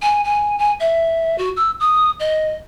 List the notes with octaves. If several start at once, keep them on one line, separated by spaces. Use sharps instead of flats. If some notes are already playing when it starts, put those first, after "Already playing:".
G#5
G#5
G#5
E5
F#4
E6
D#6
D#5